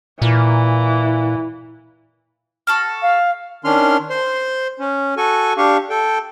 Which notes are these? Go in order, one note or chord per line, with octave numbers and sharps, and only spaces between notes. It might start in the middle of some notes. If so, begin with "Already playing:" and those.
A#2 E3
F#4 A4 F6
F5
D#3 C#4 D4 C6 F6
C5 C6
C#4
F#4 A4 G#5 C#6
D4 G4 F5 C#6
A4 G5